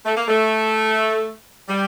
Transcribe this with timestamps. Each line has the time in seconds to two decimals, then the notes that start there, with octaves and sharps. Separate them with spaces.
0.05 A3
0.17 A#3
0.28 A3
1.69 G3